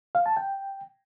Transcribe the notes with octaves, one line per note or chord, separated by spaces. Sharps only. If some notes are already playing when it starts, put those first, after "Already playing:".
F5
A5
G5